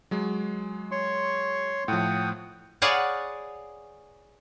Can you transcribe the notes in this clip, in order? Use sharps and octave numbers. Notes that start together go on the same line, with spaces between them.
F#3 G#3
C#5 C6 C#6
A2 F3 F#5 G5 D#6
G#4 B4 C#5 D5 F5 F#5